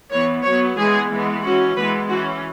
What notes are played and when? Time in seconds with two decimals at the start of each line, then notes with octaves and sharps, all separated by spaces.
0.11 E3 B3 C#5
0.43 F#3 B3 C#5
0.76 E3 G#3 B3 G#4
1.09 E3 G#3 B3
1.42 E3 C#4 F#4
1.75 E3 G#3 B3 B4
2.08 E3 C#4 F#4